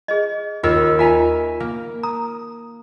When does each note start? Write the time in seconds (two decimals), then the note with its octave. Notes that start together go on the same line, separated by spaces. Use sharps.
0.08 G#4 C5 D#5
0.63 D#2 F4 A#4 D#5 E6
0.99 F4 E5 G#5 A#5
1.60 A#3
2.03 A#5 D#6